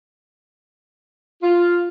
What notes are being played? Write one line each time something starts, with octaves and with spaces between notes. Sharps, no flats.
F4